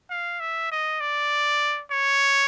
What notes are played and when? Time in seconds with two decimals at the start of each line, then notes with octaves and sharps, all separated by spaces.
0.10 F5
0.40 E5
0.71 D#5
1.00 D5
1.91 C#5